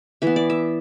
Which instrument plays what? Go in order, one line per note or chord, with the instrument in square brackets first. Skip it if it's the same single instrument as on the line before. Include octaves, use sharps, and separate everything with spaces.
[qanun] E3 B3 E5
D5
E5